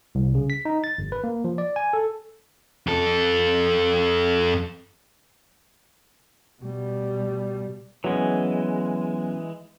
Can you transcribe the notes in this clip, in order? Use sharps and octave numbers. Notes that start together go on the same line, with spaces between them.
C2
C#3
B6
D#4
A6
G1
B4
A#3
F3
D5
G#5
A4
F2 A4
B2 G3
E3 F#3 G#3 B3 C#4